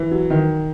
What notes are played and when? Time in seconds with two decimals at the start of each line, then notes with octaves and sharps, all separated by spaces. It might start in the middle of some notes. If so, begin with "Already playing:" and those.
Already playing: E3
0.11 F#3
0.30 D#3